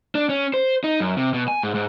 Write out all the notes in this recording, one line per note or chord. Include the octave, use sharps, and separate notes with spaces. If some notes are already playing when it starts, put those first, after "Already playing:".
D4
C#4
C5
D#4
F#2
C3
B2
G#5
G#2
G#2